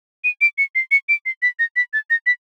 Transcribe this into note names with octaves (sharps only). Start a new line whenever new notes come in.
D#7
D7
C#7
C7
C#7
D7
C7
B6
A#6
B6
A6
A#6
B6